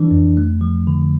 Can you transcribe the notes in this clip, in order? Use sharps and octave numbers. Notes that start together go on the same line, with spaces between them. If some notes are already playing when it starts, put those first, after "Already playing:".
Already playing: E3 D4
F2
A3
F3
D3